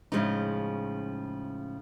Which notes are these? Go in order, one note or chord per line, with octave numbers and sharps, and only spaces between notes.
A2 C#3 F3 G#3 C#4 D#4